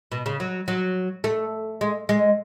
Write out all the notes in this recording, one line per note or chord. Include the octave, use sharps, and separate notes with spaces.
B2
C#3
F#3
F#3
A3
G#3
G#3